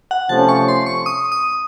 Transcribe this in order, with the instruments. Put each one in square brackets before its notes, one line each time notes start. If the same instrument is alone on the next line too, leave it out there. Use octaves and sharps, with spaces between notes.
[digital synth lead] F#5
[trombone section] C3 F3 A3 C#4 [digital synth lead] A5
[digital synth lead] C#6
C6
C#6
D#6
D#6